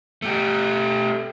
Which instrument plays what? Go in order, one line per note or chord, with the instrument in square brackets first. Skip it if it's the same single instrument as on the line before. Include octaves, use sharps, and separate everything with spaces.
[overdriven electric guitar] A3 G4